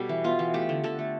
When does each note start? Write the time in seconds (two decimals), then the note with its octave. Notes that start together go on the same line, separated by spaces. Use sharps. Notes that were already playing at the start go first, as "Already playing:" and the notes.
Already playing: B2 G3 G4 A4
0.09 E3
0.24 B3 F4
0.39 E3
0.54 A3 G4
0.69 D3
0.84 D3 A4
0.99 A3